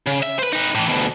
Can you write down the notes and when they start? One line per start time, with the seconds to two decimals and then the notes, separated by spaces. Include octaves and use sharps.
0.06 C#3
0.22 E5
0.39 B4 C5
0.52 D#4 B4
0.75 A2 E3
0.88 D2 B2